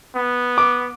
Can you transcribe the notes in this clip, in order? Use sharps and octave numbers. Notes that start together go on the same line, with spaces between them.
B3
D6